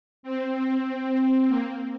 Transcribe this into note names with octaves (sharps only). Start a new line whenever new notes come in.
C4
A#3